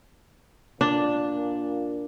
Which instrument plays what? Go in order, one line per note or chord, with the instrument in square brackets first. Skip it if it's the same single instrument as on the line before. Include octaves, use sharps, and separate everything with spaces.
[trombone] A#2 [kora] D4